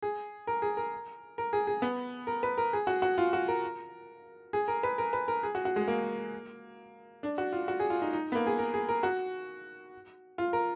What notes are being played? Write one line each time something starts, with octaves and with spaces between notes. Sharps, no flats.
G#4
A#4
G#4
A#4
A#4
G#4
G#4
B3
A#4
B4
A#4
G#4
F#4
F#4
F4
F#4
A#4
G#4
A#4
B4
A#4
B4
A#4
G#4
F#4
F#4
G#3
A#3
D4
F#4
F4
F#4
G#4
F4
D#4
D#4
B3
A#3
G#4
A#4
G#4
A#4
F#4
F4
A#4